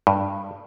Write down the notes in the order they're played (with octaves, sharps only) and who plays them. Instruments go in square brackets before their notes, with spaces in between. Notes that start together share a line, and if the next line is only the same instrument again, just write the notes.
[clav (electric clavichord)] G2